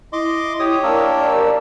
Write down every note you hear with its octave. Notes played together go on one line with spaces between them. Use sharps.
E4 D#5 C6 D6
G4 C#5 D#6
A#3 D4 A#4 D5 E6